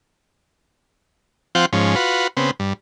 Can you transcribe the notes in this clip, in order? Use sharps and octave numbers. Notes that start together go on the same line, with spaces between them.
F3 C4 F4 F#5 G5
G#2 F3 C#4
F4 F#4 B4
C#3 B3 C4
G2